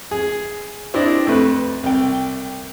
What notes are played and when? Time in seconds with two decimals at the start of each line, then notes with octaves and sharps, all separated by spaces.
0.11 G#4
0.94 C4 D4 E4 G4 D5 D#5
1.27 F2 A3 B4
1.83 C2 G5